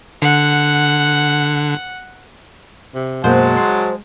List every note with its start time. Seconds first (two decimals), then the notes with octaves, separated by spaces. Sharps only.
0.22 D3 F#5
2.94 C3
3.24 F#2 B2 F#3 G#3 A#3 C5 F#5 A5
3.57 C6